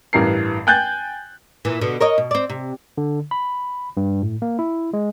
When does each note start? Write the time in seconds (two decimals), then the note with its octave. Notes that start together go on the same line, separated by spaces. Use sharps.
0.13 A1 G2 E3 G4 A#4 C7
0.67 G5 G#5 F#6 G6 A6
1.65 A#2 E3
1.81 B2 D3
2.01 A#4 C#5 D#5
2.18 B2
2.31 C4 D5
2.50 C3
2.98 D3
3.31 B5
3.97 G2
4.23 A2
4.42 A#3
4.59 E4
4.93 G#3